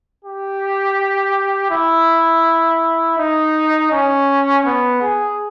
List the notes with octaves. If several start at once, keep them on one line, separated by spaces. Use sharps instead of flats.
G4
E4
D#4
C#4
B3
G#4